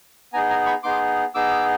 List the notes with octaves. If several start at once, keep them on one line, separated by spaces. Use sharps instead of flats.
B3 D#4 G#4 G#5 A#5
G#5 A#5
B5 C#6
B3 D#4 G#4 C6 D6
B3 D#4 G#4 D6 E6